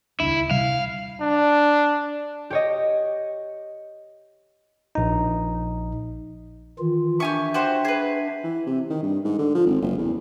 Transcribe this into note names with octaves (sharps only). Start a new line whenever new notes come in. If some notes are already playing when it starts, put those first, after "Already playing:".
D#1 C#2 D4 E4
C3 G3 F5
D4
G4 C#5 D#5
A#1 D#4
D#3 E3 F4
D4 G4 E5 G#5 C#6
F#4 G4 C5
G#4 B4
E3
C3
D#3
G2
G#2
D3
F3
G#1
F#1
E2